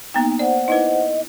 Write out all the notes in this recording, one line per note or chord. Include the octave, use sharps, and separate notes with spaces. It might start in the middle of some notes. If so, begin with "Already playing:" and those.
A#3 B3 D#4 G5
C5 D5 F#5
D#4 E4 B4 D#5